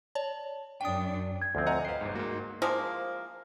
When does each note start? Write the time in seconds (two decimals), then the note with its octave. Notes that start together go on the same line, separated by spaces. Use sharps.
0.15 C#5 D5 A5
0.81 F#2 D4 G5 D#6
1.42 G#6
1.55 D2 F3 C4
1.67 D#5 F#5 G#5 A#5
1.85 B4 C5 F5 G5 C7
2.01 G1 G#2
2.15 G#2 A#3 F#4
2.62 C3 F3 G#3 A#3